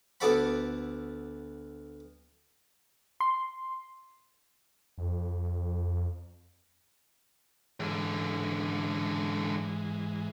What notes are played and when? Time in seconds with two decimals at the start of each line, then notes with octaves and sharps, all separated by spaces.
0.20 D2 B3 A4 D5 F#5 B5
3.21 C6
4.98 F2
7.80 C#2 G#2 D3 E3 G#3